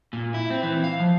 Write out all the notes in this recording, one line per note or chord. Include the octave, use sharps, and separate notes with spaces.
A#2
E4
C4
E3
F5
F3